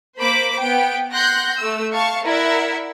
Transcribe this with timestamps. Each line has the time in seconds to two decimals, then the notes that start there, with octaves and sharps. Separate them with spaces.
0.19 A#3 C5 B5 D6 B6
0.59 B3 G5 D7
1.12 F#5 C6 F#6 G6 A#6
1.57 A3 E6
1.94 F5 A5 C#6
2.25 E4 A#4 D5 E5 F#5